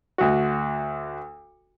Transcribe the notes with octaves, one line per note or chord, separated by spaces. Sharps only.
D2 F#4